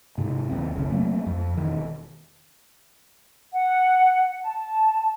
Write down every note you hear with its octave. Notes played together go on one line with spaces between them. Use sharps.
G#2 C3
D#2 C4
F1 B1 C#3
F#3 A3 A#3 C4
F2
E1 D#3
F#5
A5